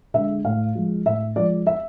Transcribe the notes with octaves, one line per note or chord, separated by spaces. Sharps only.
D3 G#3 E5
A2 F5
F3 G#3
A2 E5
F3 G#3 D5
E5